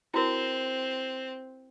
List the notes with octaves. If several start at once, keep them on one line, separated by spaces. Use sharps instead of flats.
C4 E4 F#4 A#4